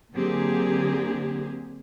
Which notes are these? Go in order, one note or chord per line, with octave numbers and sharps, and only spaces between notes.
D3 F#3 A#3 C4 G4 G#4